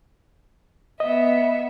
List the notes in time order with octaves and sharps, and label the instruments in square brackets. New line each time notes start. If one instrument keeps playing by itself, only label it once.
[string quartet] B3 E5 [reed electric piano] D#5